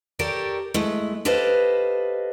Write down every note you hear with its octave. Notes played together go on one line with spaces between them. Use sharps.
G4 A4 A#4 C#5 D5
G#3 A3 E4
G4 A4 B4 C5 D#5 F5